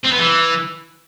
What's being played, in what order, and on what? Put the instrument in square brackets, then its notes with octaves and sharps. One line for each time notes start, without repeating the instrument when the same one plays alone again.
[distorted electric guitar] C4
B3
E3